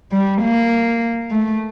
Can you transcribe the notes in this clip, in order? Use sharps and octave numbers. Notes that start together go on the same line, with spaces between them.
G3
A#3
A3